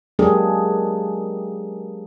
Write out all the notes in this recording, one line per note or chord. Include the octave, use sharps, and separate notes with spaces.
F#3 G#3 A#3 D4 G4 G#4